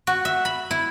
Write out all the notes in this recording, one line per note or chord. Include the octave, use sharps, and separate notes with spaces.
F#4
E5
B5
E4